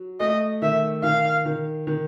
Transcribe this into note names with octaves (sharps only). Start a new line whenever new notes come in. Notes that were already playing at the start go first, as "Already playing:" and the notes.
Already playing: F#3
A3 D#5
D#3 E5
D#3 F5
D#3
D#3